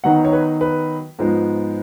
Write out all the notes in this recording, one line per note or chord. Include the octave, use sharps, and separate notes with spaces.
D#3 F#3 B3 D#4 F#5
C#5
B4
B4
G#2 F3 G#3 B3